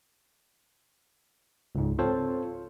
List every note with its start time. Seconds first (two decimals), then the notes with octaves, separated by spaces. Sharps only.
1.75 C#2 G#2
1.99 C4 F4 A4 C5 C#5 A5